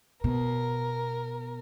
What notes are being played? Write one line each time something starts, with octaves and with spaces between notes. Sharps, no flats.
B2 A#4